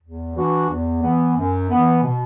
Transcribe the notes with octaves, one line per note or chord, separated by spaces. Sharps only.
E2
E3 D4 F#4
E2
E3 B3
F#2
E3 B3
B2